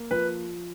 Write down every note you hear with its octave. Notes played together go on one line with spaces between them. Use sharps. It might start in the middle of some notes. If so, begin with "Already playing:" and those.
Already playing: A#3
F3 B4